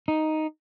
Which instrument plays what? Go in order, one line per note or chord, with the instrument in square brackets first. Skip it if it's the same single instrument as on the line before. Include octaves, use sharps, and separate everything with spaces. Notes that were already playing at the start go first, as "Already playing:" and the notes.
[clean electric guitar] D#4